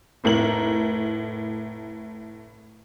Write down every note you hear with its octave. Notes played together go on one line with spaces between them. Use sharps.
F1 A2 A#4 F#7